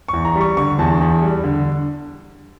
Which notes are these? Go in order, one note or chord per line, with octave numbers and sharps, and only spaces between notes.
E2 C#6
A#5
G3
C#6
D3 C#6
E2 A5
E2
G3
D3